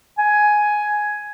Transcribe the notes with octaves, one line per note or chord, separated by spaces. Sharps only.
G#5